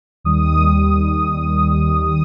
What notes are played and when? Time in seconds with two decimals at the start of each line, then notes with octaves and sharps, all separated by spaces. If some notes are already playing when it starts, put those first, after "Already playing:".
0.24 D#2 D#3 G3 D#6
1.96 D#6